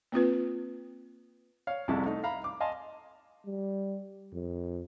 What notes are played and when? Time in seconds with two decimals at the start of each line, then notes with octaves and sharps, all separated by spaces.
0.12 A#3 C4 F4 B4
1.67 C#5 F5
1.88 C2 F2 C3 E4 G#4 A5
2.05 A3 D#4
2.23 E5 F5 A#5 B5
2.44 D6
2.60 D#5 F5 G#5 A5 C6
3.46 G3
4.33 F2